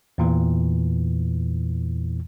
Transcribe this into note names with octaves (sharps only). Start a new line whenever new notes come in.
E2 A#2 E3